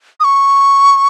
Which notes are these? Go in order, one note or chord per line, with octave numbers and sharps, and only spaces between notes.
D#6
C#6